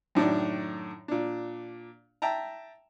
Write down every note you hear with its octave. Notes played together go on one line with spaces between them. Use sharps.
F#2 A2 D#3 D4
A#2 D4
E5 G5 A5 A#5